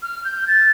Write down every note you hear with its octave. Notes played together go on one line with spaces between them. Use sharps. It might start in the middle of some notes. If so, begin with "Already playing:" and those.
F6
G6
A6